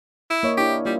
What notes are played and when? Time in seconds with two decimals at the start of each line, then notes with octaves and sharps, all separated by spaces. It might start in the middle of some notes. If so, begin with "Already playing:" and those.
0.30 E4
0.43 A#3 C#5 D#5
0.57 D4 E4 G4
0.86 G3 A#3 F4